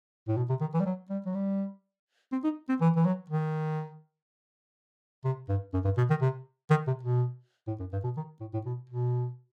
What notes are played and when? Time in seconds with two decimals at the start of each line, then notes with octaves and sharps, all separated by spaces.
0.28 A2
0.37 B2
0.50 C3
0.61 D#3
0.74 E3
0.80 G3
0.86 F#3
1.10 G3
1.26 F#3
1.35 G3
2.32 C4
2.44 D#4
2.69 C4
2.81 E3
2.96 E3
3.05 F#3
3.30 D#3
5.24 C3
5.48 G2
5.74 F#2
5.85 G2
5.97 B2
6.10 D#3
6.21 C3
6.70 D#3
6.87 C3
7.03 B2
7.68 A2
7.80 F#2
7.93 G2
8.04 B2
8.17 D#3
8.40 A2
8.54 A2
8.66 B2
8.90 B2